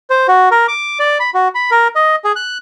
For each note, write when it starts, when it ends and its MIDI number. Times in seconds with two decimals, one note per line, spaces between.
0.10 0.27 72
0.28 0.49 66
0.51 0.67 70
0.68 0.99 86
1.00 1.18 74
1.20 1.30 83
1.34 1.48 66
1.55 1.70 83
1.71 1.88 70
1.96 2.16 75
2.24 2.32 68
2.36 2.58 90